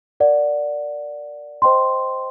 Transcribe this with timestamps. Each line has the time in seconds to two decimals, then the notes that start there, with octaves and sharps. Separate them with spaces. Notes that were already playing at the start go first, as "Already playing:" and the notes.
0.20 A#4 D5 F#5
1.62 C5 D#5 G5 C6